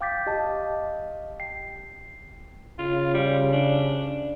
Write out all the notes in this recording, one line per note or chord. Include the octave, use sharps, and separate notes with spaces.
F5 G5 D6 G6 A6 B6
G4 D#5 F5 A5
G5 C7
C#3 F4
G3
D4